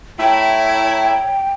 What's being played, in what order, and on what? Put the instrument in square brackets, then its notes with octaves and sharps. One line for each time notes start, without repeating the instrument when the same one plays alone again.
[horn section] A3 E4 [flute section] C#5 A#5 [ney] G5